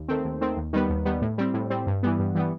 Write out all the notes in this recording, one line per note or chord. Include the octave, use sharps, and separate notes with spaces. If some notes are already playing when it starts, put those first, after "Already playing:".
Already playing: D#2
D#3 A3 C4
D#2
D#3 A3 C4
D#2
D#3 G3 B3
D#2
D#3 G3 B3
A2
G3 C4
A2
G3 C4
G2
E3 G3 B3
G2
E3 G3 B3